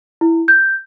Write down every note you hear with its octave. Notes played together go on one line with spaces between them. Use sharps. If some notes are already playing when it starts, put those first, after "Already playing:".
E4
G6